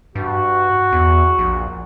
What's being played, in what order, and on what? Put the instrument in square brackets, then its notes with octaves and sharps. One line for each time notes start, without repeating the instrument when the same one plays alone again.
[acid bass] G2 [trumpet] F#4
[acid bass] E2
A#1